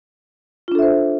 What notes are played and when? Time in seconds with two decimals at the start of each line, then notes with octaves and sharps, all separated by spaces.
0.68 F4
0.72 D4
0.75 A4
0.79 E5
0.82 C5